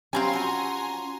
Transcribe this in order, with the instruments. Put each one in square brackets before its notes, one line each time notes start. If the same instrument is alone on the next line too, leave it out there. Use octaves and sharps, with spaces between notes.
[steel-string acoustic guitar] F#3 C#4 [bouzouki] G3 C4 F5 [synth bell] G#5 A#5 C6
[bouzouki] F3 F#4